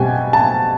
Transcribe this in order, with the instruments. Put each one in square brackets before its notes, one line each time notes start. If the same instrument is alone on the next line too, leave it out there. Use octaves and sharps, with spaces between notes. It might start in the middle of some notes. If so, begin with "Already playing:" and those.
Already playing: [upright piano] B2 G3 C4 G5 G#5
A5